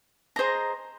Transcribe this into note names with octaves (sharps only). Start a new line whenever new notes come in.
G#4 C5 D#5 A#5